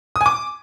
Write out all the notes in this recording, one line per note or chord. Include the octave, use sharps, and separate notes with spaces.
D#6
G#5
D6